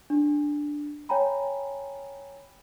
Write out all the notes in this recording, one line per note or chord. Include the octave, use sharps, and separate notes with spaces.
D4
C#5 G5 G#5 A#5 B5